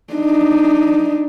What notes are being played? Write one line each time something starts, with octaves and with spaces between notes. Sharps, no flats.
D4 D#4